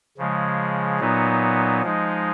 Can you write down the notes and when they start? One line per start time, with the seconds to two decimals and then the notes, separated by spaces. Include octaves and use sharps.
0.18 C#3 F3 G#3
1.00 A#2 F#3 B3 D#4
1.82 F3 G#3 D#4